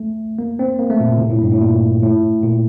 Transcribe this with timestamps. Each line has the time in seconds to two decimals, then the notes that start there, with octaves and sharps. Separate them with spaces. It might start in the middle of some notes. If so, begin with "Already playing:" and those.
Already playing: A3
0.39 A#3
0.59 C4
0.79 A#3
0.90 A3
1.00 A#2
1.10 A2
1.17 C3
1.21 A#2
1.30 A2
1.42 G2
1.51 A2
1.62 A#2
2.02 A2
2.44 A#2